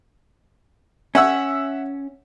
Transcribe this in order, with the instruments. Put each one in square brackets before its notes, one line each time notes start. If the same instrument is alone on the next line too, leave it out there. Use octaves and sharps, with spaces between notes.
[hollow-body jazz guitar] C#4 [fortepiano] E5 F#5 E6